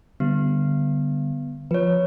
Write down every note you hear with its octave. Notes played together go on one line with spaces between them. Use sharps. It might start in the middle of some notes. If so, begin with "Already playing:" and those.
D3 G3 B3
F3 B4 C#5